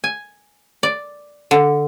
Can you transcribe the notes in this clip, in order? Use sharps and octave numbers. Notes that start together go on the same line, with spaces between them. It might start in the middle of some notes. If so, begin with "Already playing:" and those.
G#5
D5
D3